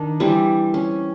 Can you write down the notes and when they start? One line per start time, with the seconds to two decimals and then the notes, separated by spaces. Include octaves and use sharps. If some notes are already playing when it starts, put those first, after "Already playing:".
Already playing: D#3 D4
0.20 E3 G3 C4
0.74 C#4